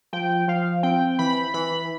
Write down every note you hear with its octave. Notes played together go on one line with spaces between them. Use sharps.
F3 G5
F3 F5
C4 G5
E3 B5
E3 B5